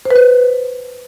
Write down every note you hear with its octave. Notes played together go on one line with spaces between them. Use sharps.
C5
B4
C5